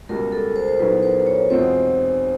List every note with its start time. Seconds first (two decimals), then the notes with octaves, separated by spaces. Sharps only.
0.09 C#2 B2 G3 A#4
0.32 A4
0.56 C5
0.68 C5
0.79 B1 A#2 F#3 B3 E4 B4
1.03 C5
1.27 C#5
1.50 E2 B2 G#3 C4 F4 C5